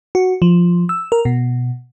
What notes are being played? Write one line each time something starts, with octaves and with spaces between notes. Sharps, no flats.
F#4
F3
E6
A#4
B2